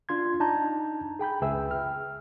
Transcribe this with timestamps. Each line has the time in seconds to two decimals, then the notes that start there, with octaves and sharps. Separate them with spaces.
0.09 D4 F4 C6 G#6
0.40 D4 D#4 A5 A#5 G6
1.19 G#4 G5 B5 G6
1.42 C#2 G#4 B4 E5 G5 E6
1.71 F6